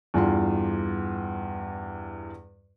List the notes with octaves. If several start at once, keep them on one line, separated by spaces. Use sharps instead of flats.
E2 G2 F4 C6